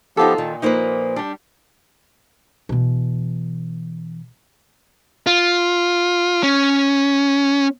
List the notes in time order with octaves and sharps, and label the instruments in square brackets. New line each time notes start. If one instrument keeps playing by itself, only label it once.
[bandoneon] F3 B3 G4 [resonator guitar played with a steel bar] D#4 F4 A4
[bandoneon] A#2 [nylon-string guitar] D#3
[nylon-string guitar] F3 A#3 C5 [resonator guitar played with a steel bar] D#4 B4
[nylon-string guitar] G3 [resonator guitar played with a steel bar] D4 G4
[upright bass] B2 E3
[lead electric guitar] F4
C#4